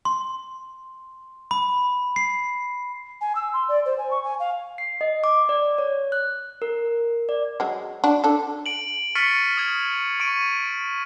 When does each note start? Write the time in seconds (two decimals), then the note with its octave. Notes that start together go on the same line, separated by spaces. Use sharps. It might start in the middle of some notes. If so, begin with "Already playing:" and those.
0.05 C6
1.51 B5
2.16 C7
3.21 G#5
3.35 E6
3.53 C6
3.69 D5
3.86 C5
3.98 G#5
4.11 C#6
4.24 G#5
4.40 F5
4.78 C7
5.01 D#5
5.24 D6
5.49 D5
5.78 C#5
6.12 F#6
6.62 A#4
7.29 D5
7.60 F#3 G#3
8.04 D4 F#4
8.24 D4 A4
8.66 D7 F#7
9.15 C#6 F6 A6 B6 C#7 D#7
9.57 D#6 G#6
10.20 C#6 D7 D#7